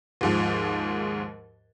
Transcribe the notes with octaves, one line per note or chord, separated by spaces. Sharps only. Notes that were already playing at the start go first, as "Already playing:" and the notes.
D#2 G#2 F3